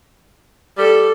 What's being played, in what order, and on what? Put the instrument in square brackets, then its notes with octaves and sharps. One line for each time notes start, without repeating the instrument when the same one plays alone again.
[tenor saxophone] G3 [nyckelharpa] A4